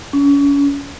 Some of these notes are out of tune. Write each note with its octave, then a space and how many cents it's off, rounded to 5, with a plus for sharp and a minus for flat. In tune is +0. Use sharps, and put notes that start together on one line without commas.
C#4 +35